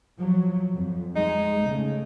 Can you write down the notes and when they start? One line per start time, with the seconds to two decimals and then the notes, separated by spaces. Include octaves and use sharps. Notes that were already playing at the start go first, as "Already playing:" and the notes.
0.18 F3 F#3
0.74 F2
1.16 G#3 D#4
1.61 C#3 A3